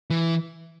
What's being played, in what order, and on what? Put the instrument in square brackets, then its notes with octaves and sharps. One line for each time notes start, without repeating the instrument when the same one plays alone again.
[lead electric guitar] E3